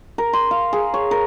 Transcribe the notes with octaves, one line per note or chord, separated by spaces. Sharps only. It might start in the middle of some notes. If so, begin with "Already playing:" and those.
A#4
C6
F5
G#4
C#5
A#4